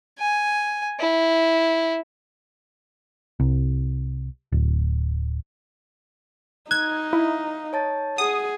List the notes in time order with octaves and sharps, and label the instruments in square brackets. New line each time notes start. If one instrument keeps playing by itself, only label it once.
[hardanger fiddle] G#5
E4
[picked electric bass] C2
D1
[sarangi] D#4 [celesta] F#6 [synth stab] G#6
[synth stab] E4 [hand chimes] F5
[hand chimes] C#5 A5 A6
[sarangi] G#4 [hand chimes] F#5 [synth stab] D#6